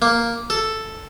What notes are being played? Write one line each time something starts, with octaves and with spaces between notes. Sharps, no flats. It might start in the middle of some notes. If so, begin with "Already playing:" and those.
A#3
A4